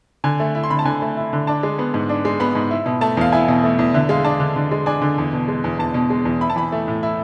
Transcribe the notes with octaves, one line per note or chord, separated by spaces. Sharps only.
D3 G#5
A3
E4
C6
D3 B5
A5
D3 G#5
A3
E4
D3
D4 A5
G#3
B3
G#2
D4
G#3
B3 B5
G#2
E4
B2
A3 A5
E2 F5
E4 G#5
B2
A3
E2
D3 E5
G#3 F5
D4 A5
D3
D3
G#3
D4 G#5
D3
E2
B2
G#3
E2
E2 A5
B2
G#3
E2
E4 B5
A5
E3 B5
A3
A2
E4